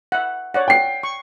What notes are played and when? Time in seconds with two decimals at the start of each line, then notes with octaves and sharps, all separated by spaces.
0.12 E5 F#5
0.54 C#5 D5 F#5
0.68 G5 C7
1.03 C#6